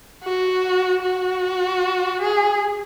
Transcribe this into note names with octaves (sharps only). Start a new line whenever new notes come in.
F#4
F#4
G#4